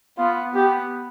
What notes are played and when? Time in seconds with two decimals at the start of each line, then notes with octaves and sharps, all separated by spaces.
0.18 B3 F4
0.54 B3 G4